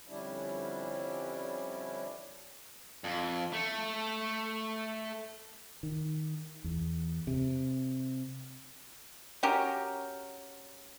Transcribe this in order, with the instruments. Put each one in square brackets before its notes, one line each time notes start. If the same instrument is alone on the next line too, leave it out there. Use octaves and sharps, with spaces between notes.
[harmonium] F2 D3 G3 C#4 D4 E4
[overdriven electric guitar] F2
A3
[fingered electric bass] D#3
E2
C3
[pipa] C#4 F#4 G4 A#4